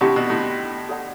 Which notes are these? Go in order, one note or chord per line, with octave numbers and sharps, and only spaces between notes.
A2 C3 D4 G4 D5 F#5
B2
A2
A4 D5 F#5 B5